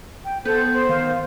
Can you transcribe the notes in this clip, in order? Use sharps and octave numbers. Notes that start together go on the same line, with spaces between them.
G5
B3 A4 C5 G6
C5
D#3 F5